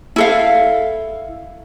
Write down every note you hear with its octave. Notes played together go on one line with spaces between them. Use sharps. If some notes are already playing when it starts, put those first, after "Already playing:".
E4 A4 F5